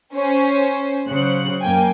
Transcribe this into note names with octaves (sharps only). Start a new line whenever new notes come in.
C#4 C5
C#3 F#3 C5 F#6 C#7
F#2 A#3 G5 G#5